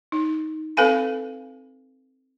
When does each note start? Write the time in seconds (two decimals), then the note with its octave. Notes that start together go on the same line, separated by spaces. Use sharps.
0.12 D#4
0.77 C4 A4 B4 F5 G#5 B5